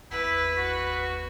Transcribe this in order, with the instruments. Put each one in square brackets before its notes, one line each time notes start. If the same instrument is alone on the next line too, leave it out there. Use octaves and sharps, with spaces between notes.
[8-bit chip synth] G#1 E2 [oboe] E4 [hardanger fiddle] B4
[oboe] F#4